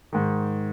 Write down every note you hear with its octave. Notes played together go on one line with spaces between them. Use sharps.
G#2 D#3